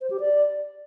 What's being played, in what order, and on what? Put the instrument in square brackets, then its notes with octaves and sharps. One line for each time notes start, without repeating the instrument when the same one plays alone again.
[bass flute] C5
G4
D5